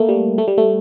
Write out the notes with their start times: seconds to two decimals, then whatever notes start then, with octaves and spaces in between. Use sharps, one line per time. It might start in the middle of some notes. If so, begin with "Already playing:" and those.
Already playing: A3 A#3
0.09 G3
0.38 A3
0.48 G3
0.58 A3